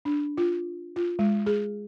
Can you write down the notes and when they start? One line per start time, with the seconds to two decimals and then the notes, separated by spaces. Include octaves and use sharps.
0.05 D4
0.38 F4
0.96 F4
1.19 G#3
1.46 G#4